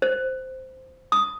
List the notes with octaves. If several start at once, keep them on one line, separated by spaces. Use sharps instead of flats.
C5
D#6